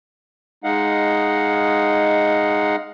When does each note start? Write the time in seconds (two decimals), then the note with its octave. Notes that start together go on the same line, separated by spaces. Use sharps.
0.64 G#3 D#4 D#5 F5 F#5